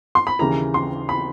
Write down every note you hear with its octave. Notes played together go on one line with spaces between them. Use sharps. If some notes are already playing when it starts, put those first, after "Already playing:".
C6
B5
D#2 C#3 E3 A#5
C6
B5